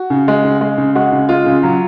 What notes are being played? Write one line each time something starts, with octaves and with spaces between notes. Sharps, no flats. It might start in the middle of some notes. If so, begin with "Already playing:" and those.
Already playing: F#4
C#3
G#3
C#3
G#3
C#3
G#3 F#4
C#3
G#3 F4
C#3
F#3